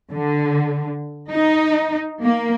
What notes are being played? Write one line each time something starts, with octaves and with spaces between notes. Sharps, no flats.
D3
D#4
A#3